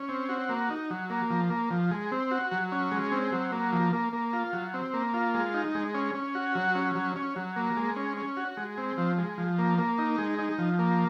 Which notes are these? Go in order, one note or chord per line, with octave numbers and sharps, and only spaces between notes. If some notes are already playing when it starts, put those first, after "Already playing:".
Already playing: C#4
C4
F#4
A#3
D#4
F#3
A#3
F3
A#3
F3
G#3
C4
F#4
F#3
C#4
G#3
C4
F#3
A#3
F3
A#3
A#3
F4
F#3
C4
A#3
F4
G#3
D#4
G#3
C#4
C#4
F#4
F#3
C#4
F#3
C#4
F#3
A#3
G#3
C#4
C#4
F#4
G#3
C4
F3
G#3
F3
A#3
A#3
D#4
G#3
D#4
F3
A#3